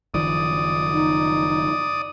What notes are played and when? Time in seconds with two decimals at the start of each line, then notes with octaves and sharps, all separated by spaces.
0.14 F#1 D#3 F3 D5 D#6
0.93 D#4